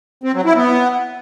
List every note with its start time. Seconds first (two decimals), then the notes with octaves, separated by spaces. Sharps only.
0.24 C4
0.34 F#3
0.45 E4
0.56 B3